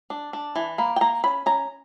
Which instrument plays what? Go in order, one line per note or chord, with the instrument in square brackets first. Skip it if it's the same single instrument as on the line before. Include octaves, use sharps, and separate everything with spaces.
[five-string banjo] D4
D4
E3
A#3 B5
G5
A#3 A#5
C#4 B5
C#4 A#5